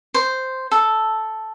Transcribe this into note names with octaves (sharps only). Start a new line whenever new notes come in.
C5
A4